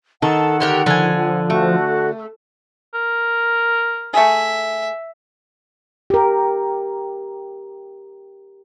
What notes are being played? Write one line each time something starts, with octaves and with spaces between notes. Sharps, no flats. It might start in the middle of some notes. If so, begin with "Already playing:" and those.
D#3 A4 F#5
D3 G4 A#4
D3 F3 G#5
A3 F#4
A#4
A3 G#4 E5
G4 A#4